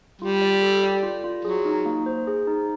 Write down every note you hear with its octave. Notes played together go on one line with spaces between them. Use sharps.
G3 F4
D5
A4
D5
F4
F4
F#3 G#4
D#4
A#3
C5
G#4
D#4